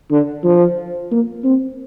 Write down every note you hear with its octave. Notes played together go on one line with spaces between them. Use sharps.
D3
F3
A#3
C4